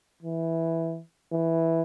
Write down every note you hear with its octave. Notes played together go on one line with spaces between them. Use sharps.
E3
E3